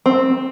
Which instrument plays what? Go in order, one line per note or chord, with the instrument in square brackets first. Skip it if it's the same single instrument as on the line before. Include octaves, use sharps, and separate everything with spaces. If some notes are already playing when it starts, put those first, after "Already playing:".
[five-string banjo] C4